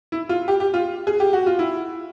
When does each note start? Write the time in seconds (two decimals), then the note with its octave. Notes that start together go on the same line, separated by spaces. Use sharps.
0.12 E4
0.29 F4
0.48 G4
0.60 G4
0.74 F4
1.07 G#4
1.20 G4
1.33 F#4
1.46 F4
1.59 E4